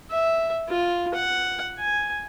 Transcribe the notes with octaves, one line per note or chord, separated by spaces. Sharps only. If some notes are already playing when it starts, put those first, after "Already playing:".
E5
F4
F#5
G#5